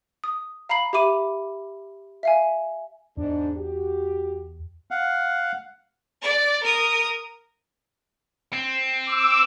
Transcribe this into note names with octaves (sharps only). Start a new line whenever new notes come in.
D#6
F5 A#5 B5 C7 F#7
G4 E5 B5 D6 D#7
E5 F5 G#5
E2 G#2 D4
F#4 G4
F5 F#5
D5
A#4 D#6
C4
D6 E6